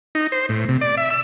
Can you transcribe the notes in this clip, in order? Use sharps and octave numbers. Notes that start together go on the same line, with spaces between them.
D#4
C5
A2
C3
D5
E5
E6